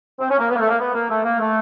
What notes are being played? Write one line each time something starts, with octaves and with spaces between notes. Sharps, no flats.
C4
C#4
A#3
B3
A#3
A3
A#3
B3
A#3
A3
A#3
A3